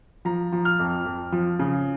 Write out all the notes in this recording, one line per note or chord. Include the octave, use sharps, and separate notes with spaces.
F3 A#5
F3
F6
F2
F2
F3
C#3